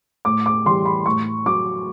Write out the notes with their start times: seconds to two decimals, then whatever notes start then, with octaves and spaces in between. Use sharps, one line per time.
0.25 A2 D6
0.46 D6
0.66 E3 G3 C6
0.86 B5
1.06 A2 C#6
1.46 F#3 D6